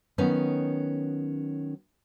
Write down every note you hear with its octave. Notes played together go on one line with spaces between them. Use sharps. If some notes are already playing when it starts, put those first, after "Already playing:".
D#3 F#3 B3 C#4 D#4 B4